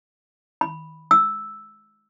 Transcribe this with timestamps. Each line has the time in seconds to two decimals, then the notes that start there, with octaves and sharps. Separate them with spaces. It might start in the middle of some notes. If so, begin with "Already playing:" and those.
0.61 B5
1.11 E6